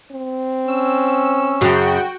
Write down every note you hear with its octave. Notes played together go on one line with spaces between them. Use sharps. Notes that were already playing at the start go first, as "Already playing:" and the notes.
C4
C#4 E6
F#2 C#3 F#4 G5